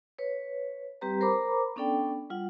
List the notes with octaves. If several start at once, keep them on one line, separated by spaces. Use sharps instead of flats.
B4 C#5
G3 C4 G4 B4 A#5
A#4 C5 A#5 B5 D6
B3 C#4 D4 A4 D5 G5
G3 F4 F#5